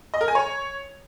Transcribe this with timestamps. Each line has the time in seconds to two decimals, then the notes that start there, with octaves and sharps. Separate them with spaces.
0.14 D#5
0.21 A#4
0.28 G#5
0.35 C#5